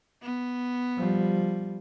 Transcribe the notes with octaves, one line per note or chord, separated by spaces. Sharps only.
B3
F3 G3